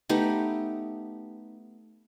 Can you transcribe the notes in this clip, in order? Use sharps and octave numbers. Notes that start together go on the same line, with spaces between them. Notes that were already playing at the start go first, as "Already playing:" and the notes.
A3 B3 D#4 G4